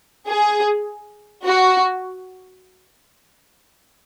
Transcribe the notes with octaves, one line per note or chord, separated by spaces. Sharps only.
G#4
F#4